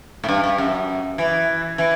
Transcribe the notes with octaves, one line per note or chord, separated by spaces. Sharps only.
A2
G2
G2
F#2
E3
E3